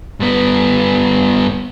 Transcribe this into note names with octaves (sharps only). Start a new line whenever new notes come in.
G2 B3